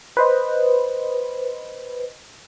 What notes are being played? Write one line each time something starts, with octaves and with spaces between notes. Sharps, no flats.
B4 C5 D#5